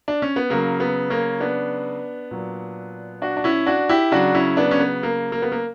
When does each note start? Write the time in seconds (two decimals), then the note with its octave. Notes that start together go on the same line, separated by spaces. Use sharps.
0.08 D4
0.22 C#4
0.36 B3
0.50 C#3 F#3 A#3
0.80 B3
1.10 A#3 C#4
1.40 B3 D4
2.31 A#2 F#3
3.22 D4 F#4
3.37 D4
3.44 C#4 E4
3.67 D4 F#4
3.89 E4 G4
4.12 C#3 F#3 D4 F#4
4.35 C#4 E4
4.57 B3 D4
4.71 C#4
4.79 B3
5.03 A#3
5.32 A#3
5.42 B3
5.52 A#3